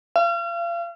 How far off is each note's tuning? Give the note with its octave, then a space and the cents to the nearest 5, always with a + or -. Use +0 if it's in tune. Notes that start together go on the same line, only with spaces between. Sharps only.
F5 -35